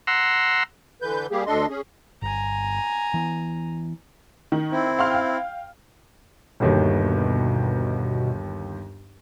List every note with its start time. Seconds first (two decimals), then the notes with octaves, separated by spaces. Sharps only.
0.07 F#5 A#5 C6 E6
1.02 D3 E3 B4 G6
1.31 G3 A#3 G4 G#4
1.47 D2 D4 A4 D#5 C6
1.69 C#4 G#4
2.22 G1 G#5 A#5
3.14 E3 B3
4.52 D#3
4.72 C4 E4
4.99 F5 C6 F6
5.11 F5 G5
6.60 G1 D#2 B2 D#3